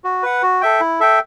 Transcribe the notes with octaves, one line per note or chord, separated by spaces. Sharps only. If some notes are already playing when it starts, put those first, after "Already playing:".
F#4
B4 F#5
F#4
A4 E5 G5
E4
A4 E5 G5